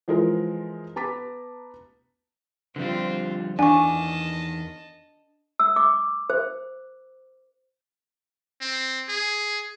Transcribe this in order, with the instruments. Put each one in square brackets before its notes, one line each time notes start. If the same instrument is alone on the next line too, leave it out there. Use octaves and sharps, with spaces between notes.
[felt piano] E3 F3 G#3 G#4 A#4
B3 A5 A#5 D6 A6 B6
[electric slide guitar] D3 F3 G3 [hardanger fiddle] C4 F4
[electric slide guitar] E2 D#3 [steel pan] D4 [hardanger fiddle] D#5 A5 [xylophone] G#5 C#6
[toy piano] E6
D6
C5
[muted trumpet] C4
G#4